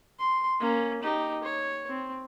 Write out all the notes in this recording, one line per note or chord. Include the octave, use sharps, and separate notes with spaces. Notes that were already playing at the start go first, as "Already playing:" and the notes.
C6
A#3 C#4
D#4 G4
C#5
C4